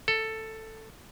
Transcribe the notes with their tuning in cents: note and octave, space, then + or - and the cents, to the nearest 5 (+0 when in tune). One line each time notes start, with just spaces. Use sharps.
A4 +10